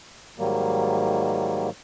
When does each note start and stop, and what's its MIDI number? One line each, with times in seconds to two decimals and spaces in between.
0.38 1.70 44
0.38 1.70 51
0.38 1.70 54
0.38 1.70 55
0.38 1.70 58